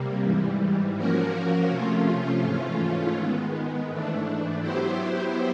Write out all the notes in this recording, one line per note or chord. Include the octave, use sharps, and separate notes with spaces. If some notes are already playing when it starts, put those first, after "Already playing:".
Already playing: C3 G3 A#3
G#2 E3 G3
F3 A#3 C#4 F#4 A#4
C3 F3 A3 C#4 F4
G#2 E3 A3 C#4 F4
D#3 G#3 B3
G#2 E3 A3 D4
F#3 B3 E4 G4 C5